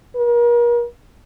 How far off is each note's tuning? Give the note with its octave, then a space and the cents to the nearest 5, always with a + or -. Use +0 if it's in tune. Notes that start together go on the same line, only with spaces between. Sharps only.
A#4 +40